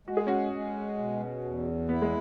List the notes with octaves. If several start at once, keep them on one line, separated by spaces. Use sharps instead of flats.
G#3 F#4
G#4
C#4 F#4
G#3
B2
E2
B3 E4
G#3